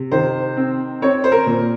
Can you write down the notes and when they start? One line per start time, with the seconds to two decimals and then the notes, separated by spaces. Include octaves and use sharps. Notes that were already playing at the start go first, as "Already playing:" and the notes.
Already playing: C3
0.12 D#3 C5
0.57 C4
1.02 C4 C#5
1.24 C5
1.32 A#4
1.46 A#2